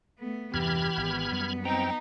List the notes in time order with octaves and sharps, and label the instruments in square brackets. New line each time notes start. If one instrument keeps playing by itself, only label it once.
[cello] A3 B3
[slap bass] E2 G2 C3 [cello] E3 [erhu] G4 [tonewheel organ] B5 F6 G#6
[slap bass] G#1 [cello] B3
[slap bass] F#2 G3
[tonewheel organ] C4 G5 A#5 [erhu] D#4